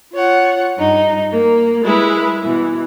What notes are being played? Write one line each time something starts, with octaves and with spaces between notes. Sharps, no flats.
F4 C#5 F#5
G2 D#4
A#3
G3 G#3 E4 B4
B2 E3